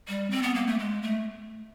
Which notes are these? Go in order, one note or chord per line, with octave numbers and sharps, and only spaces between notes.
G3
C4
B3
A#3
A3
G#3
A3